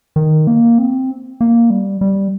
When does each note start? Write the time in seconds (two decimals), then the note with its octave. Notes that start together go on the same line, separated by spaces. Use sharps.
0.16 D#3
0.47 A#3
0.78 C4
1.41 A#3
1.70 G3
2.01 G3